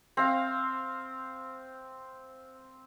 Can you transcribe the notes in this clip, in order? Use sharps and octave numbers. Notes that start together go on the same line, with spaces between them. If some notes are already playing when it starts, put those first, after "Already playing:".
C4 F5